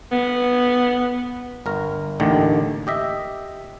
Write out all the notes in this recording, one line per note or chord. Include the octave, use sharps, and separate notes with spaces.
B3
G1 A#4
A1 D#2 D3 D#3
G4 D#5 E5